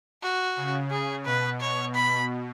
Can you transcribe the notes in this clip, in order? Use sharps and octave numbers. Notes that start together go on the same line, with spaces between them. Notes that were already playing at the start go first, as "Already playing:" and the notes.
F#4
C#3
G#4
B2 B4
C#5
B5